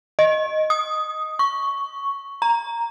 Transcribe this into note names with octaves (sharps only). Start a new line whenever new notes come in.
D#5
D#6
C#6
A#5